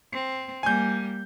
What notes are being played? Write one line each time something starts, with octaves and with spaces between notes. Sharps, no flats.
C4
G3 A#3 G#5 G6